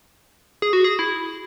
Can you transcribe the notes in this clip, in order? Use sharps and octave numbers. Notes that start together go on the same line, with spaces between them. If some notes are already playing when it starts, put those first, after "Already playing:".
G#4
F#4
G#4
E4